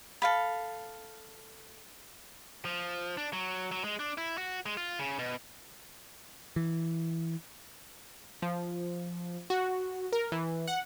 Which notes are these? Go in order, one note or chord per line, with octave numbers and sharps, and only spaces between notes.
A4 F5 B5
F3
D4
F#3
F#3
G#3
D4
E4
F#4
G#3
F4
C#3
B2
E3
F3
F#4
A#4
E3
F#5